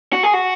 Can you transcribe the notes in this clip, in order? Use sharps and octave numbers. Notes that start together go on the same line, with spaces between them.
F#4
G#4
F#4